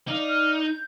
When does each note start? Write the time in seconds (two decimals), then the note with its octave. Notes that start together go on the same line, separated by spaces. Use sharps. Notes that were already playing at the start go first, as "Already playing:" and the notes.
0.07 D#4 D5 F5
0.29 F6
0.60 G6